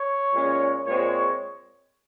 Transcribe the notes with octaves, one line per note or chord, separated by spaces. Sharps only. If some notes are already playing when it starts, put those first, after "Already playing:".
Already playing: C#5
A#2 G#3 C#4
A#2 G#3 C4 C#5